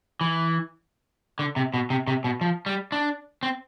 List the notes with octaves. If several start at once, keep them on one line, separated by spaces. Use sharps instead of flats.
E3
D3
C3
B2
C3
C3
B2
F3
G3
D4
C4